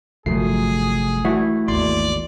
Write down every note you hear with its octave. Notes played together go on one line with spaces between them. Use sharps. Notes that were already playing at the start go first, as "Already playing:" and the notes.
G1 C2 F3 F#3 A3 G#4 C7
E3 A3 F#4
G#1 D#2 D5 C6